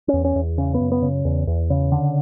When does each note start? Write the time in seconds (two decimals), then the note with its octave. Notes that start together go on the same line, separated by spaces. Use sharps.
0.08 C#4
0.14 E2
0.25 C#4
0.36 E2
0.58 C#3 C#4
0.74 B3
0.80 F#2
0.92 B3
1.02 C#3
1.25 E2
1.47 E2
1.70 C#3
1.92 D3